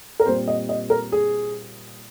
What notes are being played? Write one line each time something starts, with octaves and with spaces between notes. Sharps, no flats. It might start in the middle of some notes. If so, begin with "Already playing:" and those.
A#4
A#2 G3 C4 C5
D#5
D#5
A#4
G#4